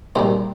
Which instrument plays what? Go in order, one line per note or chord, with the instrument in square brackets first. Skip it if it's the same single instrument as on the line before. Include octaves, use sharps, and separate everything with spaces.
[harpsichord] D#2 D#3 G3 C5